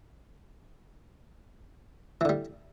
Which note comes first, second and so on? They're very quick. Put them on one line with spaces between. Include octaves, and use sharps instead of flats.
E3 D3 G3